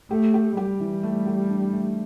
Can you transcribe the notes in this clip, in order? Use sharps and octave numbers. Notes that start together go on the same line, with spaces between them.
A3 G4
G4
G3 G4
E3
A3
G4
D4
A3